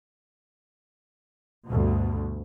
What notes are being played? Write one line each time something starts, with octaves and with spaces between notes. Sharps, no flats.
D2 G2 B2